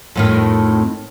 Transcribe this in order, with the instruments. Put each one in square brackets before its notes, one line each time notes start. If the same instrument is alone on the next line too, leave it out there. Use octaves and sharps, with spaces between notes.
[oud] F2 A2 D#3